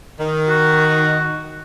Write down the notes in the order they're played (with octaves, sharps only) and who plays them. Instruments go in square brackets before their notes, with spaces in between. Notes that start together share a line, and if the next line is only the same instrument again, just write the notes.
[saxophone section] D#3
[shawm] F#4